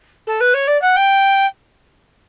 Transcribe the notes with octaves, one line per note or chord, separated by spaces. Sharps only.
A4
B4
C#5
D5
F#5
G5